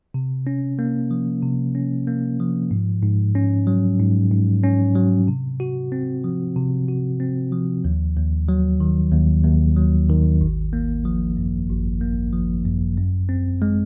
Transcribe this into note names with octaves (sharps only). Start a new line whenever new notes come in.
C3
C#4
A#3
F3
C3
C#4
A#3
F3
G#2
G#2
C#4
F#3
G#2
G#2
C#4
F#3
C3
F#4
C4
F3
C3
F#4
C4
F3
D#2
D#2
F#3
D#3
D#2
D#2
F#3
D#3
G#1
A#3
F3
F#2
G#1
A#3
F3
F#2
F#2
C4
G#3